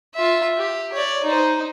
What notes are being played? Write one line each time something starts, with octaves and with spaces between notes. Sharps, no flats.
F4 E5
G4
C#5 D5
D#4 C5